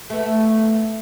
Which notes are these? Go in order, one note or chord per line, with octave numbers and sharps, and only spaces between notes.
A3 B3